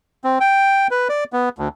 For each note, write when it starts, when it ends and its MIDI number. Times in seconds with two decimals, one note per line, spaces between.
0.24 0.39 60
0.40 0.87 79
0.91 1.08 71
1.09 1.24 74
1.33 1.49 59
1.59 1.68 38